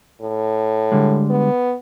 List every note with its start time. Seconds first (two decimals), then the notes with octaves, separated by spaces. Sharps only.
0.21 A2
0.92 D3 G3 G#3
1.30 B3